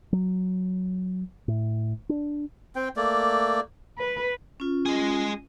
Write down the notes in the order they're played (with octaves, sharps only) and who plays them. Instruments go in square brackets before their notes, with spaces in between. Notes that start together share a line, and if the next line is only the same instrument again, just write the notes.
[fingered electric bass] F#3
A2
D4
[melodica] C4 G5
A3 A#3 D5
[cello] B4
[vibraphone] C#4 F4
[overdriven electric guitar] G#3 G#4